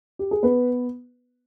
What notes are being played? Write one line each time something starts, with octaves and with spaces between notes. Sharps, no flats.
G4
G#4
B3 B4